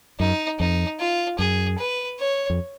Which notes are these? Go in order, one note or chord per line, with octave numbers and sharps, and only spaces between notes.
F#2 D#4
F2 D#4
F4
F#2 G#4
B4
C#5
F2